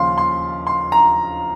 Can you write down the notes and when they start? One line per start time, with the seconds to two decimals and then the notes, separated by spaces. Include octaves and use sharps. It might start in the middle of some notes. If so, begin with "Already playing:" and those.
Already playing: D#2 C#3 F3 F5 C6
0.18 C6
0.67 C6
0.92 A#5